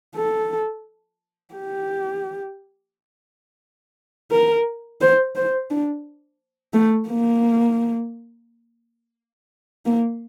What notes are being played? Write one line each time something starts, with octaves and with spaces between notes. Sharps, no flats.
A4
G4
A#4
C5
C5
D4
A3
A#3
A#3